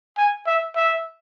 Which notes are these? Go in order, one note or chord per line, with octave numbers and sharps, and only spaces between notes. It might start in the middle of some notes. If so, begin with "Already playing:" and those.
G#5
E5
E5